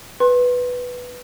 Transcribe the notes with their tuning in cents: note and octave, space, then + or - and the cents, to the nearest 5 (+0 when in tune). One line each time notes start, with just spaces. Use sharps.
B4 +0 C6 +30